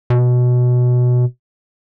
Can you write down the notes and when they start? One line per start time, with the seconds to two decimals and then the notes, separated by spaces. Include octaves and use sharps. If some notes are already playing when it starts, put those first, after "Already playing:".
0.10 B2